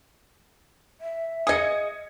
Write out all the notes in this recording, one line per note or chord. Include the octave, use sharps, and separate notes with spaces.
E5
G#4 D#5 D#6 G#6 C#7